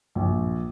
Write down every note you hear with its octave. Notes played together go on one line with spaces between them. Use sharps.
A#1